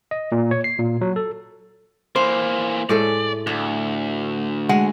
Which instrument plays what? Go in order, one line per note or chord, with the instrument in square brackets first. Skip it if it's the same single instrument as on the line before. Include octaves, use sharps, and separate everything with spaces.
[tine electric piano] D#5
A#2
C#5
C7
A#2
F#3
A4
[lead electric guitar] E3 A#3 [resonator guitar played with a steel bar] C5
[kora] A2 G#3 A3 [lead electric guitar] D5
[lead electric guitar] D2 [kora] D4
[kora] G#3 [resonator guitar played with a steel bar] F#5